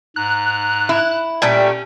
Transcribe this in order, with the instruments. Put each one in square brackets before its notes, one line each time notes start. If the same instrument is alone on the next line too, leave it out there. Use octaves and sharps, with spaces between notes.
[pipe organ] G#2 A#5 [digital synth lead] F#6
[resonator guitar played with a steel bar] E4
[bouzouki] A#2 G3 A3 [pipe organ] C#4 [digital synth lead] G5